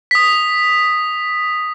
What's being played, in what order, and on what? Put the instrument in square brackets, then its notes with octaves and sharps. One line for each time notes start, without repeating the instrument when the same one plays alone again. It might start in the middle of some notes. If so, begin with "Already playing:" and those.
[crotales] D#6 B6